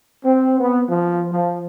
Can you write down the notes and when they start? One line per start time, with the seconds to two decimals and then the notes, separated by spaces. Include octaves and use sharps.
0.24 C4
0.60 B3
0.89 F3
1.33 F3